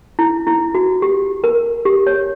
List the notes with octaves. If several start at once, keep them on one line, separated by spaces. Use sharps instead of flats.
E4
E4
F#4
G4
A#4
G4
C#5